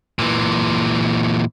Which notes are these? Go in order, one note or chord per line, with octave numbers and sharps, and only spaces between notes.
A#2 E3